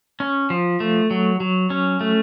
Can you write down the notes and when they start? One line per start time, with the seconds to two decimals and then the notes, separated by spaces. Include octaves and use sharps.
0.20 C#4
0.50 F3
0.80 A3
1.11 F#3
1.40 F#3
1.70 C#4
2.01 A3